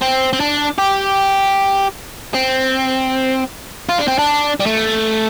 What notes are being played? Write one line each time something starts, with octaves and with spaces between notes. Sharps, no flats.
C4
C4
D4
G4
C4
F4
D4
C4
D4
G3
A3